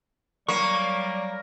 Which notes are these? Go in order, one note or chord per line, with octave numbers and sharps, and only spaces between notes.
F#3 G3 A#3 D5 C#6